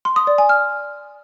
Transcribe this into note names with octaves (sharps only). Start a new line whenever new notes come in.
C6
D#6
D5
G#5
F6